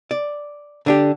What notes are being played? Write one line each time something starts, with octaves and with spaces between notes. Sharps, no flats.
D5
D3 D4 G4